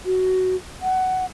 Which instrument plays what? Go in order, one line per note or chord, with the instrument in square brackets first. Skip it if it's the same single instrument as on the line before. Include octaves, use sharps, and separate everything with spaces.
[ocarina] F#4
F#5